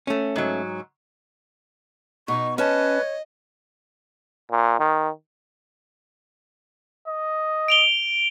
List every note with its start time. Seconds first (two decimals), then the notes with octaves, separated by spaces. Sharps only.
0.07 A3 C#4
0.36 G#2 F#3
2.28 B2 D#4 C#6
2.58 C#4 B4 C#5 D#5 A5
4.51 A#2
4.80 D#3
7.07 D#5
7.68 D7 F7 G7